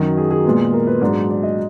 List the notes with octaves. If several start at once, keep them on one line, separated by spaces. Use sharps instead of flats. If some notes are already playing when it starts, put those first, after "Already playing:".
Already playing: F#2 D#3 F#3 F#4
G#4
G#4
A#2 G#3 B3
A#4
B4
G#2 F#3 D4 D5
D5
D#5